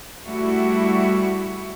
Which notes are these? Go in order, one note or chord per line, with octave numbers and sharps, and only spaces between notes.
G3 A3 E4 F#4